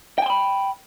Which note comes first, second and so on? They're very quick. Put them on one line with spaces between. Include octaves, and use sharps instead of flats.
G5 G#5 C6 B5